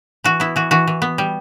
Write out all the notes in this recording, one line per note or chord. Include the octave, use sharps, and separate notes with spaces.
E3 F#4
B3 E4
E3 F#4
E3 F#4
E3
B3
G3